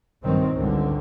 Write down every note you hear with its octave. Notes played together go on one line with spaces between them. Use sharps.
A#1 G2 D#3 F#3 C4
G#1 C#2 D3 G3